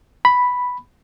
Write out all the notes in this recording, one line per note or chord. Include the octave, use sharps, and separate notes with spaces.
B5